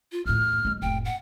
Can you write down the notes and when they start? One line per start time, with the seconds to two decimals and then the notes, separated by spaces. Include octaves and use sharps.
0.12 F4
0.26 E2 A2 F6
0.65 F#3 G#3
0.82 F1 A2 G5
1.05 F#5